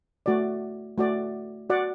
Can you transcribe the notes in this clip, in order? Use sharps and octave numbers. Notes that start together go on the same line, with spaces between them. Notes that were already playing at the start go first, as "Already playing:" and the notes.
A3 F#4 D5
A3 F#4 D5
F#4 D5 F#5